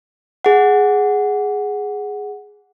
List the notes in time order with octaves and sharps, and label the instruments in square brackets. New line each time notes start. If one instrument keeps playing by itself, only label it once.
[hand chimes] G#4 F#5